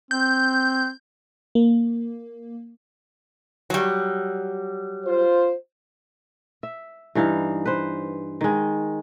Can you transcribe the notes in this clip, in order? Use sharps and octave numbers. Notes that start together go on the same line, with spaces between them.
C4 G6
A#3
F#3 G3
F4 C5
E5
G2 E3 D#4 F5
B4 C5
D#3 G#3